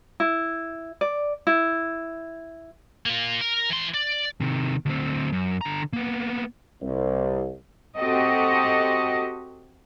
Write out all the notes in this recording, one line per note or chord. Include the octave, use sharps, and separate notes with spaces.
E4
D5
E4
A#3 F4
A#4
E3 C6
D5
C3 D#3
D2 C4
F#2
D3 A#5
A#3 B3
C2
C4 F#4 G4 A4 D#5